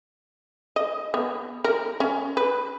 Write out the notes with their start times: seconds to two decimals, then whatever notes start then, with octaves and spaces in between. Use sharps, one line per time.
0.76 D#5
1.14 B3
1.64 A#4
2.00 C#4
2.37 B4